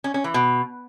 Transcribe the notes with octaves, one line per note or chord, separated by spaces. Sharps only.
C#4
C#4
E3
B2